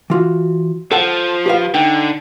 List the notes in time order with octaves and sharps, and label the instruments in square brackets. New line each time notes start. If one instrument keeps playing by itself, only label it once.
[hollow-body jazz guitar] E3 F4 F#4
[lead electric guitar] F3 [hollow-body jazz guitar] A4 F#5
[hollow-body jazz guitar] G4 B4 F5
[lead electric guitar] D3 [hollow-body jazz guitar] D#4 G5